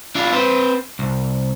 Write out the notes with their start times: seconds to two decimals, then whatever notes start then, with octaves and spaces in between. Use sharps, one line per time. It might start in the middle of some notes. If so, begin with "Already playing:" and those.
0.15 D4 E4 F4
0.33 C4 B4 C5
0.99 C2